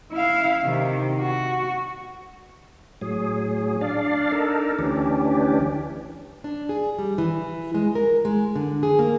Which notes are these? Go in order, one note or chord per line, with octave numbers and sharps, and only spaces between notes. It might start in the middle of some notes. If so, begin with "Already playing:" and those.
E4 F5
C3 D#3
F#4
A2 F#3 G#4
D4 D5 F5
D4 D#4 A4 A#4
D2 E3 C#4 D4 G4
D4
G#4
G3
E3
G#3
A#4
G#3
D3
G#4
A#3